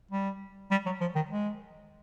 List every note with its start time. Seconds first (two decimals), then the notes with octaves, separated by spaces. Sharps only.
0.11 G3
0.71 G3
0.86 F#3
1.01 F3
1.15 D#3
1.31 G#3